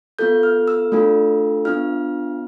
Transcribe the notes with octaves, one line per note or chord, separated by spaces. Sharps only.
B3 F4 A4 G6
F6
E6
A3 D4 F4 A4
B3 D4 F4 F6